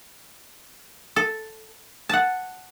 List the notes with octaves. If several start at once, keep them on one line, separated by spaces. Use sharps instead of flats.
A4
F#5 A5